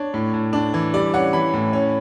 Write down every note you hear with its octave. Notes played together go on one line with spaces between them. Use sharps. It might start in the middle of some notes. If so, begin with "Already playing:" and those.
Already playing: D4 C#5
A2
A2
D4
E3
G3 D5
C#4 F#5
E3 B5
A2
C#4